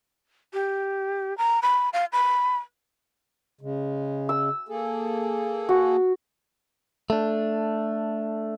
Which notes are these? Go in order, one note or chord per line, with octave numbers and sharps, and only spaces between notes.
G4
A#5
B5
F5
B5
C#3 G#3
E6
A#3 G#4 A4
F#4
A3 D4